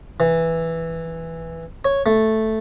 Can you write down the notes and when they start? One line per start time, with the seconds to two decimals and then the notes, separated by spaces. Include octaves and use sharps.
0.20 E3
1.85 C#5
2.06 A3